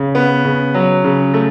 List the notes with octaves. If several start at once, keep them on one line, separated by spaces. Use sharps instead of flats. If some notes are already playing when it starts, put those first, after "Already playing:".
Already playing: C#3
B3
C#3
F#3
C#3
A3